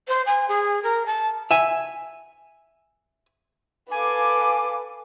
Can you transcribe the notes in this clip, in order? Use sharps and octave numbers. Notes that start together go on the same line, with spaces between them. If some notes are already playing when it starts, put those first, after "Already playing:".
C5
G#5
G#4
A#4
A5
E5 G#5
A4 B4 F5 G#5 D6